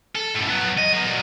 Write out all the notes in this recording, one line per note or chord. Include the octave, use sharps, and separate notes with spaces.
A4
F#2 A2
F#3 B3
D#5
F#3 B3
A#2 F#3